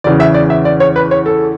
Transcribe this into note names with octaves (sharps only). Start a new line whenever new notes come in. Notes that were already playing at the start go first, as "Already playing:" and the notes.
E2 C#3 E3 D5
E5
D5
E5
D5
C#5
B4
C#5
A4